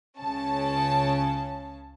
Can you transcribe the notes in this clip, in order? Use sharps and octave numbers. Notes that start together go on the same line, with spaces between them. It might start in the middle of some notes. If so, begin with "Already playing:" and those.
C#2 C#3 C#4 A5